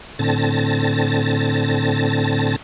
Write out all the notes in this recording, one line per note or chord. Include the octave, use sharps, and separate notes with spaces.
A2 D3 C4 A5 A6 A#6